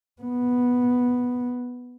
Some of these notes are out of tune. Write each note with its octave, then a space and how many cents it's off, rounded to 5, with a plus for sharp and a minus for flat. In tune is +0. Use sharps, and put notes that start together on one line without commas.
B3 -5